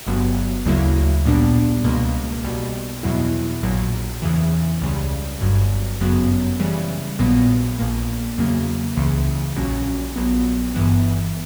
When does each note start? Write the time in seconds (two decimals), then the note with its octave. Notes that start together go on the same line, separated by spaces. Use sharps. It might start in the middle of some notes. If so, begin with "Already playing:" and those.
0.07 G1 G2 F#3 B3
0.66 D2 C#3 F#3 A#3 E4
1.25 A#1 A#2 G3 B3 D4
1.84 C#2 B2 A#3
2.44 B1 B2 G3
3.03 E2 B2 F#3 B3 E4
3.63 A#1 A#2 F#3
4.22 E2 C#3 E3
4.81 C#2 C#3 G3
5.41 G1 G2 F#3
6.00 G1 F#2 C#3 F#3 B3
6.59 C#3 E3 G3
7.19 A#1 A#2 F#3 B3
7.78 A#1 A#2 A#3
8.38 E2 C#3 F#3 A#3
8.97 C#2 C#3 E3
9.56 A#1 A#2 F#3 C#4
10.16 A#1 A#2 F#3 B3
10.74 G1 G2 E3 B3